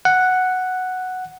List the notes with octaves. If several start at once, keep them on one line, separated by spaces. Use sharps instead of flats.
F#5